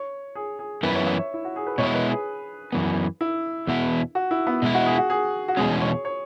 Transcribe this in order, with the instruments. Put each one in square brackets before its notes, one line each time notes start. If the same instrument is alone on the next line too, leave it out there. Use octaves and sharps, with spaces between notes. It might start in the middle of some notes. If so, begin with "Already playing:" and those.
Already playing: [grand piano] C#5
G#4
G#4
[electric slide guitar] F#2 E3 B3 E4 [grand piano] B4
[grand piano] C#5
E5
C#5
E4
F#4
G#4
B4
[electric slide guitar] B2 G#3 E4 [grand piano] C#5
[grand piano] B4
G#4
[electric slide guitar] F#2 E3 B3
[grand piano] E4
[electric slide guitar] E2 B2 B3 E4
[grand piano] F#4
E4
B3
[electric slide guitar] B2 G#3 E4
[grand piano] F#4
G#4
F#4
G#4
F#4
[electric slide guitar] E2 B2 G#3 C#4 [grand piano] G#4
[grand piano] C#5
C#5